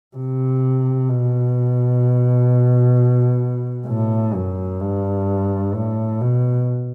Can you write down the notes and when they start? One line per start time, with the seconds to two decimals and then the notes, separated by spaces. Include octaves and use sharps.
0.17 C3
1.09 B2
3.87 A2
4.34 F#2
4.81 G2
5.74 A2
6.20 B2